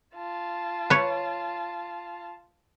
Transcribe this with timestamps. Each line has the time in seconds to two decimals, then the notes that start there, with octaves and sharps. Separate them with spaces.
0.16 F4 A5
0.90 B4 C#5